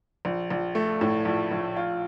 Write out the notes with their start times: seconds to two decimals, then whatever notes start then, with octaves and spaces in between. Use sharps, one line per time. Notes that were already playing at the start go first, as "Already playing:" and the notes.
0.25 A#1
0.50 A#1
0.75 A3
1.01 A2
1.25 A#1
1.51 A#1
1.76 F4